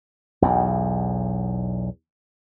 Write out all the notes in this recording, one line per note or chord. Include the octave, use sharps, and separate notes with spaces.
B1 E2